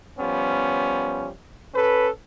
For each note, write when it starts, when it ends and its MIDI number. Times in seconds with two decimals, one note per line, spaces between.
0.19 1.29 53
0.19 1.29 55
0.19 1.29 59
0.19 1.29 61
1.74 2.08 61
1.74 2.08 69
1.74 2.08 71